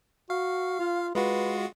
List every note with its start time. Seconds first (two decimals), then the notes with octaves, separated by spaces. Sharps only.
0.30 F#4 F5
0.80 F4
1.15 G#3 F4 F#4 B4